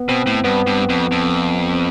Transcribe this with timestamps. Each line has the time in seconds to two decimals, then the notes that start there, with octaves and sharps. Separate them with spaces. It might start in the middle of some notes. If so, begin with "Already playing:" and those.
Already playing: B3
0.09 B2 C4
0.27 A2
0.44 G2 B3
0.67 G2
0.89 F2
1.12 F2